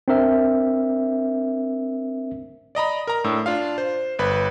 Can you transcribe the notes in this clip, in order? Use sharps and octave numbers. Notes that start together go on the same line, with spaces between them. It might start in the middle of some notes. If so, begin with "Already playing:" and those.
C4 D4 A#4 E5
D5 D#5 A#5 B5
A#4 A#5
A2 D4 E6
D4 F4 F5
C5
G1 B4 B5